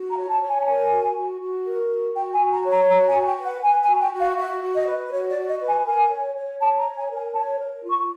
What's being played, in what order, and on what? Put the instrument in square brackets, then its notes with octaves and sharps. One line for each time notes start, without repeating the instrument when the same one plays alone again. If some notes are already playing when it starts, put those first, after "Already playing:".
Already playing: [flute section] F#4
A#5
C#5
A5
C#5
G#5
A5
A#4 G#5
F#4
F#4
F#4
A#4
F#4
F#4 G5
G#5
F#4
A#5
C#5
A#5
F#4 A#5
G#5
F#4
G5
B4
F#5
B4 G#5
G#5
F#4
G5
F#4
F5
F#4 E5
F#4
D#5
B4
F#4 C#5
D5
F#4
D#5
B4
G#5
A#4 G#5
C#5
C#5
C#5 A5
A#5
C#5
G#5
A#4
G#5
C#5 A5
A#4
F4
C#6